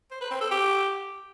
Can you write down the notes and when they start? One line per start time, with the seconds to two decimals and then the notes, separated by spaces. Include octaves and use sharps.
0.11 C5
0.21 B4
0.31 C4
0.41 A4
0.51 G4